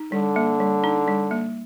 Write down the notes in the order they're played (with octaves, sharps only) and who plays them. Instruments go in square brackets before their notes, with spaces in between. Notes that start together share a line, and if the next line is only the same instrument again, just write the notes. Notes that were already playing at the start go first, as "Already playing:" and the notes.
Already playing: [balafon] D#4
[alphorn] D3 [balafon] G3
[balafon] A#3
G3
D#4
G3
A#3